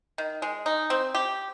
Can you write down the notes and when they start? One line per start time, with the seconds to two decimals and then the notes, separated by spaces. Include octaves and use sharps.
0.18 D#3
0.42 G#3
0.66 D#4
0.90 C4
1.15 G4